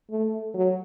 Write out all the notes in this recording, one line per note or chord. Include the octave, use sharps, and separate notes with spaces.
A3
F#3